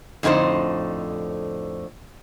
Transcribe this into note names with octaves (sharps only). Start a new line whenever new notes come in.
F2 A2 D3 D#4 C5